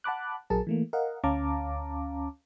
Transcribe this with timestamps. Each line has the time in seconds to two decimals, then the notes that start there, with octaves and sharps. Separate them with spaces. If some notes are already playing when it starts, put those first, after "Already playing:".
0.04 F#5 A5 B5 D6 F#6
0.50 A#1 F#3 G#4 A#4 A5
0.67 E3 A3 A#3
0.93 A#4 D#5 F5 F#5
1.24 D2 C#4 F5 A5 A#5 D6